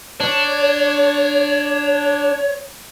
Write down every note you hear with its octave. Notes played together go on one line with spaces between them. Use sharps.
D4 C#5